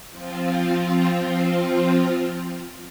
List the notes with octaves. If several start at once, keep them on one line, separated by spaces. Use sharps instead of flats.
F3 C4 F4